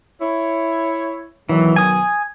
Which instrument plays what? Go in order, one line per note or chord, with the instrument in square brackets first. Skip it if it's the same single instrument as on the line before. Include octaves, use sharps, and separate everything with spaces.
[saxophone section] E4 C#5
[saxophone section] B2 D#3 F#3 [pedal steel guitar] E3
[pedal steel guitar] G#5 D#6